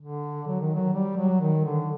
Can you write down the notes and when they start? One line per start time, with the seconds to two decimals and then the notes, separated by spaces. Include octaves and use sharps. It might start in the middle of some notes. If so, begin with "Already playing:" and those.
0.01 D3
0.47 F#3
0.61 D#3
0.74 F#3
0.94 G3
1.17 F#3
1.40 D#3
1.64 D3